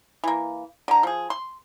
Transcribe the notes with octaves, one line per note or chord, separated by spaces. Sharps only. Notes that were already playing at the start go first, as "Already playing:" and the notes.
E3 A#3
D3 A#5
F3 G#4
C6